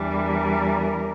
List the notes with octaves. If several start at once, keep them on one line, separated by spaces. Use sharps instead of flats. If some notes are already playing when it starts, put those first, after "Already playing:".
Already playing: E2 E3 G3 D4
A#4